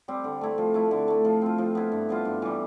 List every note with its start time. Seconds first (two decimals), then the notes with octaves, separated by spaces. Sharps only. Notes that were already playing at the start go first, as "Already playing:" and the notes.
0.08 G3 C4
0.24 D3
0.41 A3 E4
0.58 F3
0.74 A3 E4
0.91 D3
1.08 A3 E4
1.25 F3
1.42 C4 F4
1.58 F3
1.75 B3 E4
1.92 G2
2.09 F3 B3 F4
2.25 G2
2.42 E3 G3